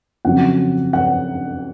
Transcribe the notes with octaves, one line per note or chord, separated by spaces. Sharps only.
F2 C#3 F#3 F#5
F#5